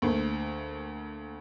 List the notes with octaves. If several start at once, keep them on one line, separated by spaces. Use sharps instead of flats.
D2 A3 A#3